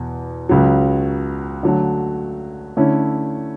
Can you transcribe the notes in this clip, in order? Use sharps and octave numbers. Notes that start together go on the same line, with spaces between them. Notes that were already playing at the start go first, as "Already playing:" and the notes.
Already playing: E2 B2
C#2 C#3 F#3
D3 F#3 A3
D3 A3 C#4 E4